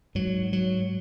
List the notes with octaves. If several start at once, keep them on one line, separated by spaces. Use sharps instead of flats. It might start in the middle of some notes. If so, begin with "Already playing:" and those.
G#2 F#3
F#3